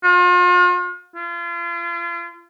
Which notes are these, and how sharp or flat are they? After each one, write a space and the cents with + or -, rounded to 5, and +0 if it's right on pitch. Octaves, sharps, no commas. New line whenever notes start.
F4 +40
F4 -35